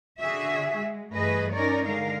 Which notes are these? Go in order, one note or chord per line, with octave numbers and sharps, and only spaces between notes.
D3 F#4 G#4 E5
G#3
G2 E3 A3 G#4 B4 D#5
C#4 D#4 A#4 C#5 D5
D3 G#3 A#4 F5